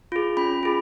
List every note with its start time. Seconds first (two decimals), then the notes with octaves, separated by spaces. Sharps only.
0.12 F4 G#4
0.37 C#4 B5
0.63 F4 G#4